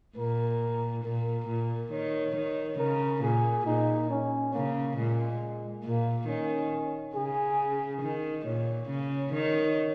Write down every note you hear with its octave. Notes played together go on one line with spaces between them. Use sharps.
A#2 A#4
A#2 A#4
A#2
D#3 C#5
D#3
C#3 A#4
A#2 G#4
A#2 D#4
C#4
C#3 A#3
A#2 G#3
A#2 A#3
D#3 C#4
C#3 G#4
D#3
A#2 C#5
C#3
D#3 C#5